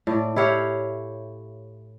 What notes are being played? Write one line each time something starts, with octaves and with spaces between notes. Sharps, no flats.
A2 D5
E4 G4 C#5 F5